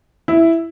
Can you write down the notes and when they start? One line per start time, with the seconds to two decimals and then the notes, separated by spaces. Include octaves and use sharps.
0.28 E4